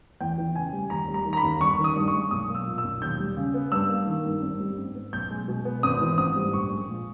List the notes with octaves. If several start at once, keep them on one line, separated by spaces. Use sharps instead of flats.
E2 G5
E3
C#3 G#5
G3
D#2 A#5
G3
A#5
D#3
A#5
B5
D#2
G1 C#6
D#3
D#6
G2
C#6
G#3
B1 D#6
A#3
E6
A#2
E6
B1
D#2 G6
G3
C#3
B3
G2 E6
A#3
D#3
G2
G#1
G3
G#2
B3
B1 G6
G#3
B2
B3
G#1 D#6
E3
G#2 D#6
G3
A#1 C#6
G#3
A#2